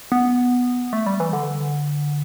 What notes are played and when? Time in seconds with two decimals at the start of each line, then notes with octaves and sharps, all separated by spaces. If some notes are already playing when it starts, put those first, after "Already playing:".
0.12 B3
0.93 A3
1.06 G3
1.20 E3
1.33 D3